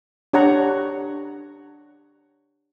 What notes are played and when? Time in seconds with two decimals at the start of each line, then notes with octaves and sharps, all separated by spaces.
0.33 D4 G4 C#5 F#5 A#5 C#6